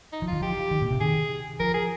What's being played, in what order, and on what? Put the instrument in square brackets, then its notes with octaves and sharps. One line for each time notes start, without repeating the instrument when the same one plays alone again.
[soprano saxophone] D#4
[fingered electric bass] F3
[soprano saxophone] F4
[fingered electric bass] D#3
[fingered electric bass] F3 [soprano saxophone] G4
[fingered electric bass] D#3
A#2
C3
[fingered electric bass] D#3 [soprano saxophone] G#4
[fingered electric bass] F3 [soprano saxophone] A#4
[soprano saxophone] G#4